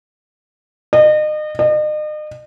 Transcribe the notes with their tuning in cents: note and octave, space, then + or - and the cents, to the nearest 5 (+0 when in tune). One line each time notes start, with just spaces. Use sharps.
D#5 -35
D#5 -40